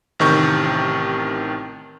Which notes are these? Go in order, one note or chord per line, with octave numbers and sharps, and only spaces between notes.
A1 C3 D#3 C#6 G6